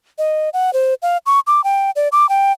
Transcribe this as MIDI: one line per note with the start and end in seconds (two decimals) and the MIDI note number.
0.18 0.49 75
0.53 0.73 78
0.73 0.94 72
1.02 1.17 77
1.26 1.40 85
1.47 1.63 86
1.64 1.91 79
1.96 2.08 74
2.12 2.29 86
2.29 2.52 79